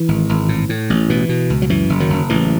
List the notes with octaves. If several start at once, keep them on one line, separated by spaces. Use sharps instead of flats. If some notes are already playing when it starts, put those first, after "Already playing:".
Already playing: E3
G#1
G#1
A2
A2
A1
B2 E3
B2
C#2
F#3
F#2 E3
F#1
D#3 F#3
F#1
A1 E3